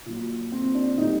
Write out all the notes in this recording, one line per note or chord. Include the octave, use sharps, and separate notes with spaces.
A#2 F#3
C4
D4
A2 G3 D#4